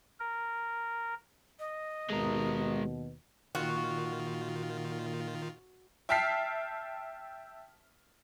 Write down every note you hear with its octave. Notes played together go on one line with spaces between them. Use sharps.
A#4
D#5
D#2 B2 G#3 A#4
A#2 D#3 F4 F#4
E5 G5 A5 F6 B6 C7